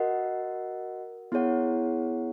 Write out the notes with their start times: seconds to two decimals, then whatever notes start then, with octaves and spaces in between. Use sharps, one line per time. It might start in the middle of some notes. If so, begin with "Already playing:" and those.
Already playing: F#4 A#4 D#5 F#5
1.32 B3 E4 G#4 C#5 F#5